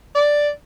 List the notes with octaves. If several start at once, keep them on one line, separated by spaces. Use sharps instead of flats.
D5